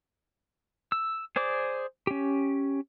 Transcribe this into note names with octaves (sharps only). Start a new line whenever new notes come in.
E6
G#4 C5 D5 D6
C#4 G4